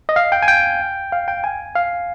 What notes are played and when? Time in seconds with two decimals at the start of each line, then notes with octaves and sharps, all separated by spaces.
0.09 D#5
0.16 F5
0.32 G5
0.43 G#5
0.48 G5
1.12 F5
1.28 G5
1.44 G#5
1.76 F5